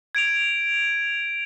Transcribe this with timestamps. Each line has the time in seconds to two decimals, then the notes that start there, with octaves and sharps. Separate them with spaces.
0.15 G#6 D7 F7